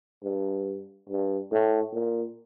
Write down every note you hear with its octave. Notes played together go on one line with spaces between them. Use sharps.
G2
G2
A2
A#2